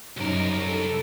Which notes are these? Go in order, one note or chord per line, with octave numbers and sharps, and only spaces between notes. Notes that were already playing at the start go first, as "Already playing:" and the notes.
C2 F#2 D#4 A#4 C#5
A4